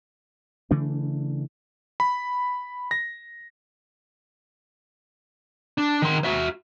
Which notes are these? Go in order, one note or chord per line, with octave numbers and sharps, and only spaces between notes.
C#3 E3 A3 D4
B5
A#6
D4
D#3 C6
F#4 E5